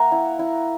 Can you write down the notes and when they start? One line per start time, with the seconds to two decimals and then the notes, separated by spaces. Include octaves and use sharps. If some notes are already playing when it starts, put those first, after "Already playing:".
Already playing: A#3 E5 F#5 A#5
0.12 E4
0.39 E4